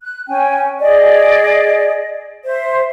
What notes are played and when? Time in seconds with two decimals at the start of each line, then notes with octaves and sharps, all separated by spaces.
0.02 F#6
0.29 C#4 G5 G#5
0.80 G#4 D5 D#5
2.45 C5 E5